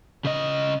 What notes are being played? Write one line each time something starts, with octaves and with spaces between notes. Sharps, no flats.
C#3 D#5